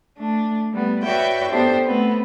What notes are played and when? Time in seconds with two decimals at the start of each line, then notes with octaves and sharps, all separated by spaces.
0.17 A3 D4
0.71 G3 A3 B3
1.03 F#4 B4 C#5 D5 E5 G5
1.49 B3 D4 G4 A4 C5
1.84 A3 B3 C4